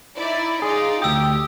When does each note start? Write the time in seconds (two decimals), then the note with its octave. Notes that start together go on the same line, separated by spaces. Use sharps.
0.16 D#4 E4 D5
0.62 D#4 F4 G#4 D5
1.02 D2 G4 G5 D#6 E6